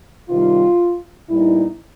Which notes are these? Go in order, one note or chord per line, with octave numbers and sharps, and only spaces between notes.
C3 D#3 G3 F4
A#2 G3 B3 D#4 E4